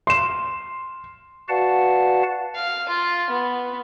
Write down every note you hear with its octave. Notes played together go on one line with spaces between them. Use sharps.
C6 E7
F#4 B4 D5 F5 F#5 A5
F5
F4
B3